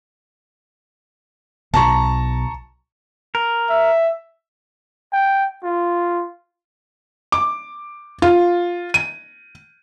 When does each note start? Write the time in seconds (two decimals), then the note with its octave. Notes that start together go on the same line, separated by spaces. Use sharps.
1.74 B1 A5 A#5 C#6
3.35 A#4
3.70 E5
5.13 G5
5.63 F4
7.32 D6
8.22 F4
8.94 D#7